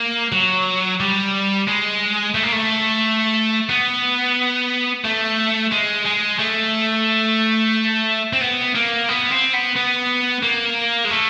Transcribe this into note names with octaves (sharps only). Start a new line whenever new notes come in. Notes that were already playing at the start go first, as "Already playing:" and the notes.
Already playing: A#3
F#3
G3
G#3
A3
A#3
A3
B3
A3
G#3
G#3
A3
C4
B3
A#3
B3
C4
B3
B3
A#3
G#3
A3